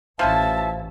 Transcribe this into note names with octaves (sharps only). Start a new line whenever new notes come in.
A1 F3 C#4 E4 E5 A5